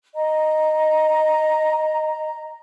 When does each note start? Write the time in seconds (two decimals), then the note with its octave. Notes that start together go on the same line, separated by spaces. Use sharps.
0.14 D#5 A#5